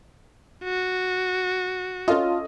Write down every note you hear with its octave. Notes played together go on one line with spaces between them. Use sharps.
F#4
C#4 F4 A4 D#5